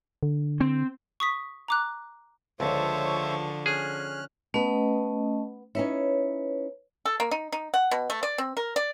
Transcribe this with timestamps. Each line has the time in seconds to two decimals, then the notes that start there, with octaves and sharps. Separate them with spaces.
0.23 D3
0.61 C4
1.20 C#6 D#6 B6
1.68 A#5 D6 F#6
2.60 C#2 D3 F3 C5 C#5 E5 A5 C#6
3.66 C#4 G#4 F6 F#6
4.54 A3 B3 C#4 B4 D#5
5.75 C#4 D#4 E4 B4 C#5
7.05 A4
7.20 A#3
7.31 D#4
7.52 D#4
7.74 F#5
7.91 B2
8.10 A3
8.23 D5
8.38 C4
8.57 A#4
8.76 D5